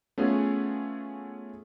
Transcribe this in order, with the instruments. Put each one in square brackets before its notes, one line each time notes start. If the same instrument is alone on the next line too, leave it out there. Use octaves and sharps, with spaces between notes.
[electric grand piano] A3 B3 C#4 F4 G#4